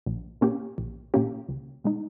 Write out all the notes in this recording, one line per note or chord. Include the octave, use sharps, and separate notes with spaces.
A#1
A#2 A#3 C#4 G4
A#1
A#2 A#3 C#4 G4
C#2
B2 G#3 D#4